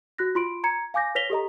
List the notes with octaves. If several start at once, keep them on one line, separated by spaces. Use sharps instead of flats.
F#4 F#6 A#6
F4 C6 D7
A#5 G#6 C#7
F5 G#5 D6 G6 A#6
B4 C#5 A#6 B6 F7 G7
G4 A4 D#5 A#5